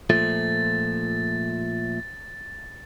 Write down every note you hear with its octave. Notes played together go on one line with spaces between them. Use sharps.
A#2 F3 A3 A6